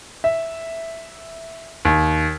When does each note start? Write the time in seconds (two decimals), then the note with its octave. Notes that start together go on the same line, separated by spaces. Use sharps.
0.24 E5
1.85 D#2